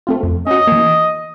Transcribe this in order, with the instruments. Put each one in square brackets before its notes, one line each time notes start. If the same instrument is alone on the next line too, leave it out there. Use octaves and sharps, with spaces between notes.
[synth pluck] A3 C4 F4
F2
[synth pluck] C#4 F#4 [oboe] D#5
[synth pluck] E3 A#3